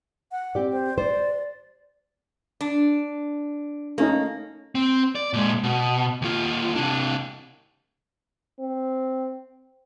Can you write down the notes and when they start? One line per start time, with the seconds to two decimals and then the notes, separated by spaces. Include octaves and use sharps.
0.32 F#5
0.55 C4 G4 D5
0.72 C5
0.98 C5 D5
2.61 D4
3.98 A3 A#3 C#4 D#4
4.75 C4
5.15 D5
5.33 A#2 G#3
5.64 B2
6.22 D#2 F4
6.76 C3 D4
8.60 C4